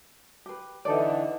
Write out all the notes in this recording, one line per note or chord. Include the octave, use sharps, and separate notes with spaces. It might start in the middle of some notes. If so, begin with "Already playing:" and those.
G4 B4
D3 E3 D#4 A4 D5